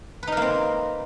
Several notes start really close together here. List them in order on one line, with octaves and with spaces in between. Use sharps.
B4 D#4 A#4 A#3 C4